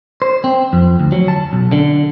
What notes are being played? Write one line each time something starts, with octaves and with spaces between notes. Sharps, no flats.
C5
C4
F2
D2
F#3
A5
B1
D3